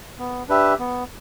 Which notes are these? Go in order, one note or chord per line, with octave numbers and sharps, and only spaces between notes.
B3
D4 G4 B4 E5
B3